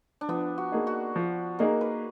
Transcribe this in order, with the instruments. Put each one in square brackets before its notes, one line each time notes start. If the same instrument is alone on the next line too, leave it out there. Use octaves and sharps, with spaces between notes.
[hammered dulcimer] D4
[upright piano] F3 [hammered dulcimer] B3
[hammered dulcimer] F#4
[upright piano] A#3 D#4 G#4
[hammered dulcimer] F#4
[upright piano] F3
[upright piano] A#3 D#4 G#4 [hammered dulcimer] A#4
[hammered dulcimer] B4